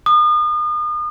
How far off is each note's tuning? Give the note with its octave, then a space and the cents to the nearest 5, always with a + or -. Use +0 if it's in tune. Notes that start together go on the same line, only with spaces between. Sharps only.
D#6 -40